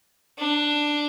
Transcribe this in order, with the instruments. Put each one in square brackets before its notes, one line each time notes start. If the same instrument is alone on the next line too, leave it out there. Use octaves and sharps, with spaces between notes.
[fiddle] D4